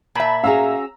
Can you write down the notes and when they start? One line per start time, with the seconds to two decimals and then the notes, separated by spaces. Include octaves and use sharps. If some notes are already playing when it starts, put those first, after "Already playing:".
0.15 A#2 E5 A5 B5
0.43 C#4 F#4 G#4 F5 A#5 E6